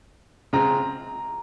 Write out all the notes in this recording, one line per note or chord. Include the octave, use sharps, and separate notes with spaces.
C#3 G#3 C4 A#5